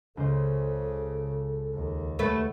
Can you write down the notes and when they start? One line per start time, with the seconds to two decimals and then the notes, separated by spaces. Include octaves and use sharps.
0.17 C#2 C#3 A4 C5
1.74 D#2
2.19 A3 B4 C#5 F#5